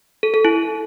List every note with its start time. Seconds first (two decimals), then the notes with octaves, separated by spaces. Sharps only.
0.23 A4
0.34 A4
0.45 E4